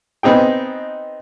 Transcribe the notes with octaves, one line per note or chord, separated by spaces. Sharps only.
B3 C4 D#4 G#4 G5